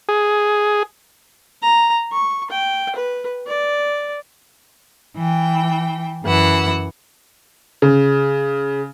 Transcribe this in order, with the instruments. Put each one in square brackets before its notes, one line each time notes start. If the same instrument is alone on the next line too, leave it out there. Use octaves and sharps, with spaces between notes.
[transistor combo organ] G#4
[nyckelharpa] A#5
C#6
G5
B4
D5
[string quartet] E3 G5
F#2 E3 F#5 E6
[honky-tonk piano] C#3